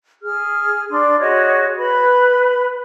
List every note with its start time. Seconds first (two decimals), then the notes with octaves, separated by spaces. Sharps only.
0.22 G#4 F6
0.90 D4 D5 C6
1.20 F#4 G#4 C#5 D#5
1.78 B4 B5